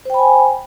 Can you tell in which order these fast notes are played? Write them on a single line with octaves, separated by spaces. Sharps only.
C5 G5 B5 G#5